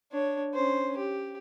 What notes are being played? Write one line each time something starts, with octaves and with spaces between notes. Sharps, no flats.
D4 C#5
C#4 C5
G4